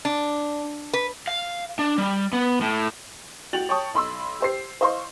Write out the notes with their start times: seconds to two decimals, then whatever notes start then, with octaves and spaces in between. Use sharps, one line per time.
0.05 D4
0.93 B4
1.28 F5
1.79 D4
1.98 G3
2.33 B3
2.61 A2
3.53 F#4 G5 A6 F7 F#7
3.69 C#5 G5 A5 C#6 D#6
3.94 B1 B5 C6 E6
4.40 G4 C5 C7
4.81 C5 D#5 F5 C6 C#6